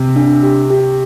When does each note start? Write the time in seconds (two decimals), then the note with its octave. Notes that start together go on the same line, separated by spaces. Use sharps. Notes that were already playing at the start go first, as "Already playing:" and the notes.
Already playing: C3
0.16 D4
0.43 G4
0.70 G4